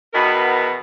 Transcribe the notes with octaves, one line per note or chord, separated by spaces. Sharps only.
E2 B2 D#3 B3 F#4 A#4